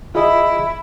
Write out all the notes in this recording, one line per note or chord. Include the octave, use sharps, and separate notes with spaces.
E4 F4 G#4 D#5